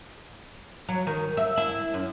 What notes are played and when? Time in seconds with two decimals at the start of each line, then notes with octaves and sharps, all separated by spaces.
0.89 F#3
1.07 D#3
1.37 E5
1.57 E4
1.94 F#2